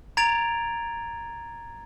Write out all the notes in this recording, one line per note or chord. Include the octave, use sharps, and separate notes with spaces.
A#5 G#6 A6 D7 F7